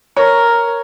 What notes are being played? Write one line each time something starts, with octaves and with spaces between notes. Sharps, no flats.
A#4 C#5